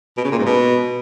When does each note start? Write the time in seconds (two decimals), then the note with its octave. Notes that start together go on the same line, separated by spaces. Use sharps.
0.17 B2
0.24 C#3
0.31 A#2
0.38 G#2
0.46 B2